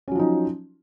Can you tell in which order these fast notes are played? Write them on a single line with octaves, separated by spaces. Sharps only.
C#4 F#3 F3 D#4